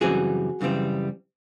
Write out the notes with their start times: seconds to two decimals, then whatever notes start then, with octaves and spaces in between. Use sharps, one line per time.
0.01 F#2 C#3 E3 G3 C4 F#4 G#4
0.61 F#2 C#3 E3 G3 C4